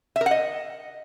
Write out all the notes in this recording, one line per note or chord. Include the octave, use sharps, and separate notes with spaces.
E5
A#4
F#5
D#5